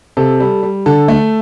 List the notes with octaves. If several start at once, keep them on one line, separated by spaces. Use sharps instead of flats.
C3 A4
G3
G3
D3 A4
A3